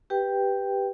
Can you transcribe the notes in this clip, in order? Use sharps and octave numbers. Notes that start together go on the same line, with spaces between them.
G4 B4 G5